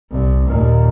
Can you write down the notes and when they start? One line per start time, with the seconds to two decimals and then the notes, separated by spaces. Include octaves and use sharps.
0.11 C2
0.46 D#2 A#2